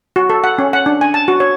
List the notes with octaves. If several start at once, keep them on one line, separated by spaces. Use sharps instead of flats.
F#4
A4
F#5
C#4
F#5
D4
G#5
A5
F#4
C#5